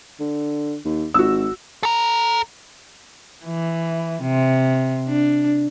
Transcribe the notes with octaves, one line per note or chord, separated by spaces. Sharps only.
D3
D#2
G#1 F#4 E6
A4 A#5
E3
C3
D4